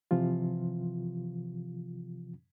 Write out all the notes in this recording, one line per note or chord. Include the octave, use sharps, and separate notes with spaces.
C3 E3 F3 F4